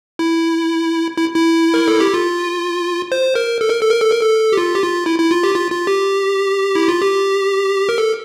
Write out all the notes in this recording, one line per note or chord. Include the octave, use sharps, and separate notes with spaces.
E4
E4
E4
A#4
A4
G4
F4
C5
A#4
A4
A#4
A4
A#4
A4
A#4
A4
G4
F4
G4
F4
E4
E4
F4
G4
F4
F4
G4
E4
F4
G4
A#4
A4